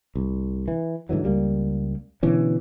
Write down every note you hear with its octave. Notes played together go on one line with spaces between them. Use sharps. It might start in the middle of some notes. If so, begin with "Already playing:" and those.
C2
E3
G#2 D3 E3 F#3
C#2 G3 A#3
B2 D3 E3 C#4